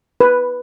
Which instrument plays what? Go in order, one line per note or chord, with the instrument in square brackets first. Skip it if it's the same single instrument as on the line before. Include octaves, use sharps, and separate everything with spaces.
[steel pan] B4